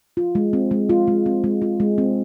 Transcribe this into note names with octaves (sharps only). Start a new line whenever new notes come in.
F4
G#3
C4
G#3
F4
G#3
C4
G#3
F4
G#3
C4